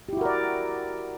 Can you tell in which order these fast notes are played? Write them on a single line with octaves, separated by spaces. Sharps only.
G4 E4 F#4 A#4 D5